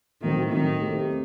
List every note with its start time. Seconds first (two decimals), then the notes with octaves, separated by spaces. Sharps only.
0.22 A2 D#3 F#3 C4
0.51 A2 D#3 F#3 C4
0.82 A3 C4 G4